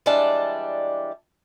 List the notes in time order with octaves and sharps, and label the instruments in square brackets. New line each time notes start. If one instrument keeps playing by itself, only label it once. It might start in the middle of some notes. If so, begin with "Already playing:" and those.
[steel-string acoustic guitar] E3 G3 G#3 D4 D5 A5